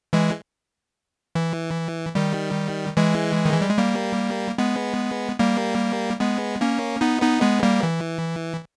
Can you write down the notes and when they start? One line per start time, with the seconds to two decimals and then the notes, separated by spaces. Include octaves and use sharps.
0.13 E3 G#3
1.35 E3
2.15 D#3 G3
2.97 E3 G#3
3.45 D#3
3.53 E3
3.61 G3
3.70 G#3
3.77 G3 A#3
4.58 G#3 B3
5.39 G3 A#3
6.20 G#3 B3
6.61 A#3 C#4
7.01 B3 D#4
7.22 B3 D#4
7.42 G#3 B3
7.63 G3 A#3
7.83 E3